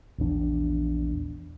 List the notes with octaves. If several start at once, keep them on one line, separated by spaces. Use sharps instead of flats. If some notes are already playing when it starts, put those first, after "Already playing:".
A#1 E2 D4